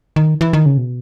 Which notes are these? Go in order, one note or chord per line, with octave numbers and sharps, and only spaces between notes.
D#3
E3
D#3
C#3
B2